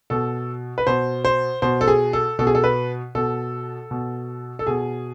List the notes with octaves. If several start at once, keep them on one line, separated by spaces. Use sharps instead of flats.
B2 A4
B4
B2 C5
C5
B2 C5
A4
G#4
A4
B2 A4
G#4
A4
B4
B2 A4
B2
A4
B2 G#4